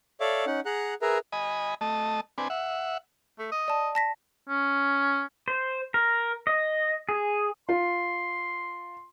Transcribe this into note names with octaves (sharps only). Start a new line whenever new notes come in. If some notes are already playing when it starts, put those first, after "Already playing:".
A4 C#5 D5 E5 F5 D6
C#4 D#4 F#5
G#4 F#5 A#5 F#6
G#4 A#4 B4 E5 A#5
D#5 G#5 B5
A3 D#5 A5
C4 D4 B4 G#5
E5 F#5
A3
D#5
D5 A5
A5 A#6 B6
C#4
C5
A#4
D#5
G#4
F4 C6